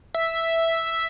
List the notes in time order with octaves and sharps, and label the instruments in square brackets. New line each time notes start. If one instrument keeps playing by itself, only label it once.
[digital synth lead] E5